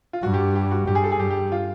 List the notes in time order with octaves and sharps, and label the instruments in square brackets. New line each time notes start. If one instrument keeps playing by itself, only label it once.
[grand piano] F4
[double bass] G2 [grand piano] F#4
[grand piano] G4
G4
F#4
[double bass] G2 [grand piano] G4
[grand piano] G#4
A4
G#4
[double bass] G2 [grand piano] G4
[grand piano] G4
F4